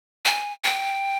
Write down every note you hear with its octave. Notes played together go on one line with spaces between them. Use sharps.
G#5
G5